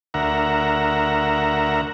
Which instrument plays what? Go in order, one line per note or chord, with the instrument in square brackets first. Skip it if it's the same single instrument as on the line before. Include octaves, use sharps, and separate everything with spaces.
[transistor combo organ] D2 A#4 E5 F#5 A#5